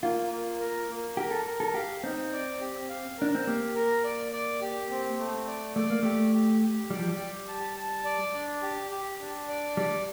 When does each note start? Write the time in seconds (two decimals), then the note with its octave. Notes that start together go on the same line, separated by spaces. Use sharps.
0.02 A#3 F4
0.31 A#3
0.60 A#4
0.89 A#3
1.17 G4 A#4
1.31 A4
1.45 A#4
1.60 A4
1.74 G4 F5
2.04 C4 D#4
2.33 D5
2.60 G4
2.89 F5
3.18 D4 A#4
3.35 C4
3.47 A#3 G4
3.75 A#4
4.04 D5
4.32 D5
4.61 G4
4.90 C4
5.19 A3
5.47 D5
5.75 A3 D5
5.90 A#3
6.03 A3 G4
6.33 G4
6.62 G4
6.90 G3 D5
6.99 F3
7.08 G3
7.20 G4
7.48 A5
7.77 A5
8.05 D5
8.34 D4
8.62 G4
8.91 G4
9.20 D4
9.49 D5
9.77 G3 D5